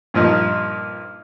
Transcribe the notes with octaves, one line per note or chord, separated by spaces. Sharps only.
G2 A#2 F3 D#4